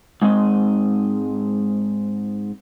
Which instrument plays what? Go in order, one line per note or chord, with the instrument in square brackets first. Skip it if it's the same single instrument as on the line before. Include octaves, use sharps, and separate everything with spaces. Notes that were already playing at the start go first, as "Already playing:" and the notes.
[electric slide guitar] G#2 G#3 C4 D#5